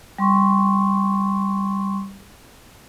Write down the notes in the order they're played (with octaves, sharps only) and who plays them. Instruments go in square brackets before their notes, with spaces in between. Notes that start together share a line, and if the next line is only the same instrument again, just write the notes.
[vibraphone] G3 C6 C#6